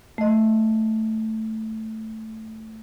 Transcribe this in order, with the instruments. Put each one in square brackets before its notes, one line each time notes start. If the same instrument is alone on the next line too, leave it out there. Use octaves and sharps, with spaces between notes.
[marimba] A3 D#5